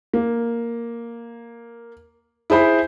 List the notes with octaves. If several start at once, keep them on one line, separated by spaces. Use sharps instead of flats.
A#3
E4 G#4 C5 B5